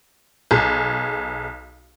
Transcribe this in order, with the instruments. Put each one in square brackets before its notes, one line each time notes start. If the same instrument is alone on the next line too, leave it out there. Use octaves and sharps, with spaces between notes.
[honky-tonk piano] B1 G#4